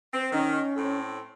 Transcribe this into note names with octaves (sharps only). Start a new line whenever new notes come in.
C4
D#3 C#4
A2 C4 A4